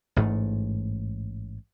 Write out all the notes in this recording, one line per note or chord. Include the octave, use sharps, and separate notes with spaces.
A1 G#2 A3